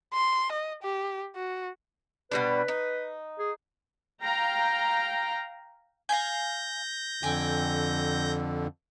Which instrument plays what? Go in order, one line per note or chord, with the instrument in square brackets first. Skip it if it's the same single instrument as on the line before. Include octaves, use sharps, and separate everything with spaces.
[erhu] C6
D#5
G4
F#4
[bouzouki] B2 G3 D4 [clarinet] B4
[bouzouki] D#4
[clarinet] G#4
[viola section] F5 G5 A#5
[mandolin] F5 G5 G#5 [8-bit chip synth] G6 A#6
[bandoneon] F2 D3 [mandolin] G5 G#5